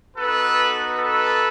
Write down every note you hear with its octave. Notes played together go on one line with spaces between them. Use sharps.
B3 D#4 F#4 A4 B4
A4 B4